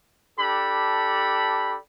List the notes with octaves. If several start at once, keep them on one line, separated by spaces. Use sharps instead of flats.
D4 G4 A4 B5